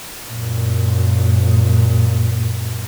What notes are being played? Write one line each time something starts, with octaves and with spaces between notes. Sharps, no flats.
F#2 A#2